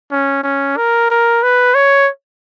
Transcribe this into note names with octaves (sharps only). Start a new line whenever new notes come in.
C#4
C#4
A#4
A#4
B4
C#5